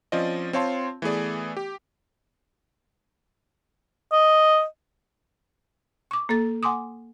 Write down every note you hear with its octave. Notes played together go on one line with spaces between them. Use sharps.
F3 C4 C#4 F4 D5 D#5
C4 F4 C#5 F5 A5 C6
E3 A3 B3 G#4 D5
G4
D#5
C#6 D6
A#3 A4 A6
F#5 G#5 C6 D6 D#6